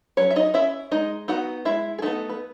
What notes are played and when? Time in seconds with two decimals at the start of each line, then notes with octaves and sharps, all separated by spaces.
0.17 F#3 C#4 C#5
0.30 E5
0.36 D#4 D#5
0.54 C#4 E4 E5
0.91 G#3 D#4 D#5
1.28 B3 D#4 F#4 F#5
1.65 G#3 E4 E5
1.98 G#4
2.02 A3 B3 D#4 A4
2.29 B4